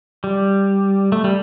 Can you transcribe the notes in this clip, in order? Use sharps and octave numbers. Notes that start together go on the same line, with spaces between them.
G3
A3
G3